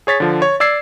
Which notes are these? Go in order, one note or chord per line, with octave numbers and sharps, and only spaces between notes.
G#4 C#5 A6 B6
D3 F3
C#5
D5 E6 G#6 C7